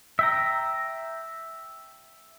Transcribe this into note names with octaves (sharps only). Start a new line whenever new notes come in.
E5 G5 A#5